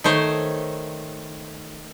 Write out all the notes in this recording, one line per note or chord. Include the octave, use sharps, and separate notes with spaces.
D#3 A3 C5 C#5